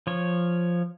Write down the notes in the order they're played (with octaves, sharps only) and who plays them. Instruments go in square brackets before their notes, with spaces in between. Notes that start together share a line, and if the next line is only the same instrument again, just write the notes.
[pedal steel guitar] F3 C#5